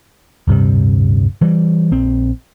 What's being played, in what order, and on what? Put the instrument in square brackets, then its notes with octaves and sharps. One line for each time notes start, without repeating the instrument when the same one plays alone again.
[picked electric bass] D1 G2 C3 G3
E3 G3
A#1 C4